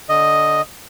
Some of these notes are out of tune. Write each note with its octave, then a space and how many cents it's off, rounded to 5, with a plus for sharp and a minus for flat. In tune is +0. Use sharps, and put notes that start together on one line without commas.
D3 -10 D#5 +0